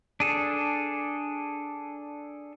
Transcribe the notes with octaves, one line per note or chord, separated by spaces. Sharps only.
D4 G#4 A4